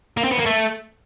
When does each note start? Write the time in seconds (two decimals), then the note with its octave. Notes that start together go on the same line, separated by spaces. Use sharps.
0.17 A#3
0.24 C4
0.31 B3
0.38 A#3
0.46 A3